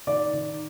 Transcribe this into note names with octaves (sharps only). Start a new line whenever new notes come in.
D#3 D5
D#3